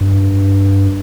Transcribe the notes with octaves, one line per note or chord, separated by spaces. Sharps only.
G2